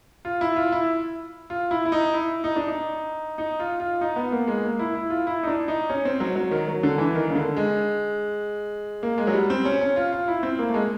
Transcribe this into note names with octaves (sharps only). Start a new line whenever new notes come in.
F4
E4
F4
E4
F4
E4
E4
D#4
E4
D#4
D4
D#4
D#4
F4
F4
D#4
B3
A#3
G#3
A#3
E4
E4
F4
E4
D#4
D4
D#4
C#4
C4
F#3
F#3
D#3
F#3
D3
E3
D#3
C#3
D3
G#3
A#3
G#3
F#3
G3
C4
C#4
C#4
F4
F4
E4
C4
A#3
A3
G#3